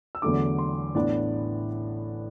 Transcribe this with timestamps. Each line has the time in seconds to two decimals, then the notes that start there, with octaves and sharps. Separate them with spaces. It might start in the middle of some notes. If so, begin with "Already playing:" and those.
0.15 E6
0.22 E2 D3 F#3 A3 D4 D6
0.59 C6
0.95 A1 A2 E3 B3 D4 D5